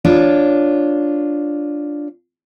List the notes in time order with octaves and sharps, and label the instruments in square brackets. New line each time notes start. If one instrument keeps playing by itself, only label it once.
[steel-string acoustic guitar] D4 F4 C#5